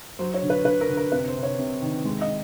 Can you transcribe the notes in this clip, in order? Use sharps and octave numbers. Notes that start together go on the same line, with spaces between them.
F#3 C5
C#5
D3
B4
D3 B4
A#4
D3
A#4
C3 B4
C5
C3
C#5
C3
D#3
G#3
D#5